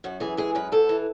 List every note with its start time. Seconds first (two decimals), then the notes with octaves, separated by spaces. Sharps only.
0.04 F#2 F#4
0.20 E3 G#4
0.37 G#3 G#4
0.55 F#2 B4
0.72 G#2 A4
0.89 E3